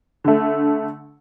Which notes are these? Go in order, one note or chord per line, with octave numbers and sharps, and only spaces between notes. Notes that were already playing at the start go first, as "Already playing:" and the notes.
D3 A3